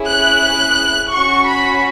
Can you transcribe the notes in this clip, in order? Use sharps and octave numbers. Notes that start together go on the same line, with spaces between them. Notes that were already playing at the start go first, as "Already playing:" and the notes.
Already playing: C#4 E4 G#4
F#6
C#4 F#4 C#6
B5